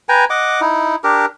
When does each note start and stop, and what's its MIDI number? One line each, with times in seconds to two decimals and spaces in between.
0.09 0.25 71
0.09 0.25 79
0.09 0.25 80
0.09 0.25 82
0.30 0.61 75
0.30 0.61 78
0.30 0.61 86
0.61 0.96 63
0.61 0.96 64
1.04 1.26 62
1.04 1.26 67
1.04 1.26 70